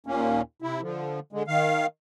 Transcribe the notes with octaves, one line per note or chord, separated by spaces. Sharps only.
D#2 A#2 A#3 C#4
C3 E4
D3 F3
D3 G#3
D#3 F5